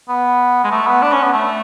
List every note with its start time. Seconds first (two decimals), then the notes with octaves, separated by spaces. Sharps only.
0.09 B3
0.64 G#3
0.71 A3
0.87 B3
1.02 D4
1.12 C#4
1.22 B3
1.33 A3